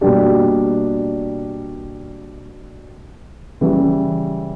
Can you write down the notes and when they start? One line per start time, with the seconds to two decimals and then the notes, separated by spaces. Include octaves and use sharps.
0.01 B2 G3 A#3 D4 G4
3.61 C#3 E3 G3